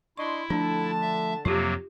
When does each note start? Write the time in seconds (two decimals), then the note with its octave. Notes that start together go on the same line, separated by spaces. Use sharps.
0.17 D4 E4 D#5 C6 C#6
0.50 D3 F3 A3 D4 A5
1.02 E5
1.45 F2 C3 F#3 A#3 F4 G4